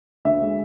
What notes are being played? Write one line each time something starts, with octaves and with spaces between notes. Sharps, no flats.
D2 E5
G#3